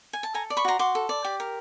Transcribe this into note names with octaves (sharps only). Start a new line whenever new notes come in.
G#5
A5
A4 G#5 A#5
D5
B5 C#6
F#4 A#5 C6
F#4 C6 D6
A4
D5
G4
A#4